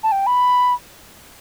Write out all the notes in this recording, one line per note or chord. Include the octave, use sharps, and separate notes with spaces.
A5
G5
B5